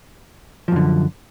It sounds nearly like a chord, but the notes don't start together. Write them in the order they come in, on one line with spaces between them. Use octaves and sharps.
F3 F#2 D3